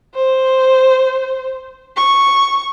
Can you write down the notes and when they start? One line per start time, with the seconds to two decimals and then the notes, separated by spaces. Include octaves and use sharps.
0.15 C5
1.97 C#6